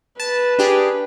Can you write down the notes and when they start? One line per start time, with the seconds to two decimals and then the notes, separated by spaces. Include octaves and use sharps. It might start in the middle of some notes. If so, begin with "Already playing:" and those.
0.20 B4 A5
0.59 D4 G4 G#4